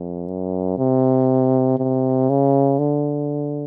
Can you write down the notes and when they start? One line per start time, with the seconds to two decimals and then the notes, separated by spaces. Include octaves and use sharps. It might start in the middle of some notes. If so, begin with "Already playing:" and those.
Already playing: F2
0.28 F#2
0.78 C3
1.78 C3
2.29 C#3
2.79 D3